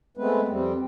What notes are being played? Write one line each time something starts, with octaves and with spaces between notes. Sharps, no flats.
G#3 A3 B3 C4 B4
F2 G3 C4